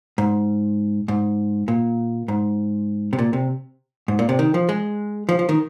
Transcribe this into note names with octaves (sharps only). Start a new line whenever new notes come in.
G#2
G#2
A#2
G#2
C3
A#2
C3
G#2
A#2
C3
D#3
F3
G#3
F3
F3
D#3